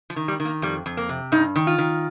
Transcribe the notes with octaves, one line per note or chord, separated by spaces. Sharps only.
F3
D#3
G3
D#3
A#3
F2 G3
F2
A#3
C3
G2 D#4
D#3
F4
D#3